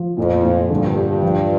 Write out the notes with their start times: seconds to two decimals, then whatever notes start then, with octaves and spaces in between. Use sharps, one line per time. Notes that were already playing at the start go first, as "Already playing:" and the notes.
Already playing: F3
0.17 F2 A#2
0.44 A#2
0.70 G2 D3
0.96 G4
1.23 F3